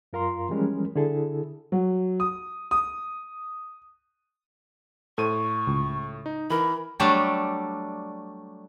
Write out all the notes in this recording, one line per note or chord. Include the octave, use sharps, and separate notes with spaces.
F#2 F4 A#4 F5 A#5 C6
E3 F3 G3 G#3 C#4 A#4
D3 E4 G#4 A4
F#3
D#6
D#6
A2 A4 C5 C#6 D#7
C#2
D#4
E3 A#4 B5
F#3 G3 A3 D4 G4 A4